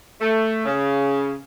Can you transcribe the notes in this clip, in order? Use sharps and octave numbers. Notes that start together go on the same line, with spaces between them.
A3
C#3